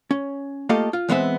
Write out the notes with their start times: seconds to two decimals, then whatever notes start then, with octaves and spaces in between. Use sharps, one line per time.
0.11 C#4
0.69 A3 A#3 F4 G4 A4 D#5
0.93 F4
1.09 E3 G#3 B3 C4 E5